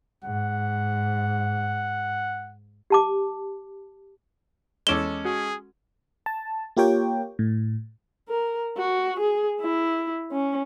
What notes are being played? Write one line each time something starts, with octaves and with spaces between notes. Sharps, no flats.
G#2 F#5
G4 A5 D6
E2 G#3 C#4 A4 D6 E7 G7
F#4 G#4
A5
A#3 F4 G4 A#4 C#5 G5
A2
A#4
F#4
G#4
E4
C#4